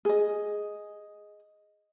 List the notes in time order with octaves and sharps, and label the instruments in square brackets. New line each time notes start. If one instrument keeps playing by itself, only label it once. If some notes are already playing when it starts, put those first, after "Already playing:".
[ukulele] G#4 D#5